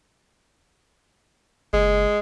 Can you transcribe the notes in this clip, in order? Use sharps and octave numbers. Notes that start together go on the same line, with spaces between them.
F#1 G#3